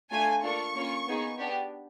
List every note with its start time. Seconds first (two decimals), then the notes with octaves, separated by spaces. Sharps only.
0.10 A3 D4 F4 A4 G#5
0.43 A#3 D4 F4 A4 C#6
0.75 A#3 C#4 F4
1.07 B3 D#4 G#4
1.38 B3 D4 G4